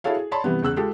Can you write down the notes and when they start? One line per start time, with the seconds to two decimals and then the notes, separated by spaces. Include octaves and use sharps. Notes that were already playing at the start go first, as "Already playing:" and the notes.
0.04 E4 F#4 G#4 A4 C#5 F5
0.17 G#4
0.31 C#5 D5 A5 B5 C6
0.44 C3 E3 G3 B3
0.62 E2 C#3 E6 F#6
0.76 G#3 F4 G4 A4